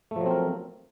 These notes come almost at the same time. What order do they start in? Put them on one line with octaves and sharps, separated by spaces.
A3 F3 F#3 C4 A#4